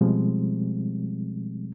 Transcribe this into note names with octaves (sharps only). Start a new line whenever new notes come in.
B2 F3 G3 G#3 C4